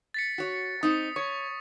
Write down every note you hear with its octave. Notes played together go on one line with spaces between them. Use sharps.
A6 B6 C#7
F#4 C#5
C4 D#4 D#6
C#5 C#6